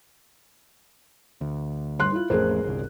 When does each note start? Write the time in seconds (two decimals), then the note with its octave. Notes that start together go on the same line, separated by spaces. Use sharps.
1.41 D2
1.99 G1 C6 F#6
2.12 E4 F4
2.30 A1 F2 A2 G#4 A#4 C5
2.64 G1 C2